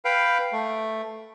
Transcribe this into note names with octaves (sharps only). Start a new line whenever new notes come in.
B4 F5 G5
A3